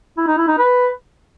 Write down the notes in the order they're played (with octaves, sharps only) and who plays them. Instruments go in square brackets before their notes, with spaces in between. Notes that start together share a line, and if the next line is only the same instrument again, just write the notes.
[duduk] E4
D#4
E4
D#4
B4